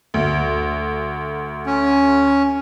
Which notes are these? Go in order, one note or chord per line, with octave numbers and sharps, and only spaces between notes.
D2
C#4